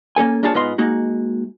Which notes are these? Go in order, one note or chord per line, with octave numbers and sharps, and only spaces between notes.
A#3 C#4 A4 G#5
A#3 D4 F4 G#4 C#5 A5
G#2 B3 F4 D#5 C6
G#3 A#3 D#4 F#4